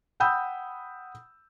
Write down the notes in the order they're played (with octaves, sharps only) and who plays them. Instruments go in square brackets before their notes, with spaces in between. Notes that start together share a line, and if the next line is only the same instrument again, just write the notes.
[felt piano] F#5 G5 B5 D#6 E6 G6